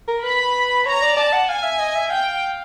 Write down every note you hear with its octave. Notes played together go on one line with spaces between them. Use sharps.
A#4
B4 B5
C#5 A#5
D5
D5 A5
F#5
F5 G#5
E5
D#5
E5
F5 G5